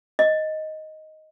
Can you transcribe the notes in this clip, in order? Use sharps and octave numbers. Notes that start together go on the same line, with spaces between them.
D#5